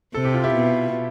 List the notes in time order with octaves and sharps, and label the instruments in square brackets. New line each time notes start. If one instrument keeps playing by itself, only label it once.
[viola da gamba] C3 [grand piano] A4
[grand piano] G4
F4
E4 G4
[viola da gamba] B2